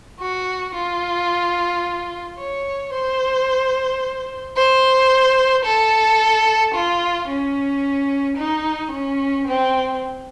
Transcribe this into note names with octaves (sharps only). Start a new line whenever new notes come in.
F#4
F4
C#5
C5
C5
A4
F4
C#4
D#4
C#4
C4